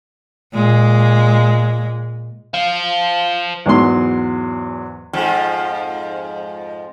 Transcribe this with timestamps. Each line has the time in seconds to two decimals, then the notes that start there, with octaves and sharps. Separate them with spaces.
0.53 A#2 G#3
2.54 C5 F5
3.66 E2 G#2 F#3 C6
5.13 F2 G#2 F3